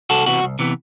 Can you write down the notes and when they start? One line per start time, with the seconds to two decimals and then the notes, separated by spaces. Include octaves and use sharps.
0.10 C2 F#4 A4
0.26 C3 E3 B3 F#4
0.42 C2
0.59 C3 E3 B3